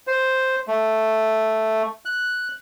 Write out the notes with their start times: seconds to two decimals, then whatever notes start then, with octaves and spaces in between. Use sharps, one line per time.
0.07 C5
0.68 A3
2.05 F#6